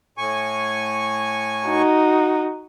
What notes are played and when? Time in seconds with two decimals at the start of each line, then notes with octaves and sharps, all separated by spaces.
0.18 A2 G#5 C#6
1.68 D#4 F#4